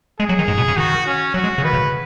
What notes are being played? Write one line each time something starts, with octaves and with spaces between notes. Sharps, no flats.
G#3 G#4
F#3
D#3
G#2
B2
C#3
D#3 F#4
C#4
F#3 F#4
G#3
C#3
D#3 B4
C#3